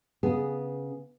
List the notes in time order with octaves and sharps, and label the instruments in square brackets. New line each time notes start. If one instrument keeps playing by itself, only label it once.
[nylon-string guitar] C#3 B3 G#4